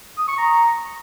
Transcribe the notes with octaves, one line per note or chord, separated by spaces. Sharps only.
D#6
C#6
A#5